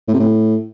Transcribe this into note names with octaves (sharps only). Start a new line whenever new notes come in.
A2
C3
A2